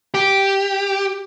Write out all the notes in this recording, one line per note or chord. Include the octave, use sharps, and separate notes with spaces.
G4